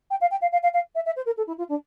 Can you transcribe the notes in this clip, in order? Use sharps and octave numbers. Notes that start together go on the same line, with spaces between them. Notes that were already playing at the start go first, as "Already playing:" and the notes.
G5
F5
G5
F5
F5
F5
F5
E5
E5
C5
A#4
A4
E4
F4
D4